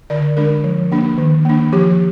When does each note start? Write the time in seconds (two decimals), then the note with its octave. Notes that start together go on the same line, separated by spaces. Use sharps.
0.10 D3 D5
0.37 G#3 D4 A#4
0.64 F3
0.92 A#3 D4
1.18 D#3
1.45 A#3 D4
1.72 F3 G4